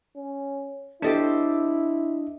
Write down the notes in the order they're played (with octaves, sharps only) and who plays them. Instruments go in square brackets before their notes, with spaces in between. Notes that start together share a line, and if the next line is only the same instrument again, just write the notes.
[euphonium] C#4
[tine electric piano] D4 D#5 [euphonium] E4 [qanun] G4 A4 C5